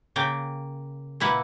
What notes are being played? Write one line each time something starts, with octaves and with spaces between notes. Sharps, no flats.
C#3 A#3 G5
A#2 A#3 E4 B4 F#5